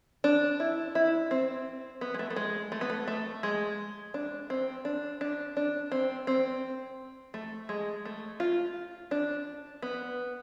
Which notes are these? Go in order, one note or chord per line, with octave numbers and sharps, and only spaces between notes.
D4
E4
E4
C4
B3
G#3
A3
A3
G#3
A3
B3
A3
A3
G#3
D4
C4
D4
D4
D4
C4
C4
A3
G#3
A3
F4
D4
B3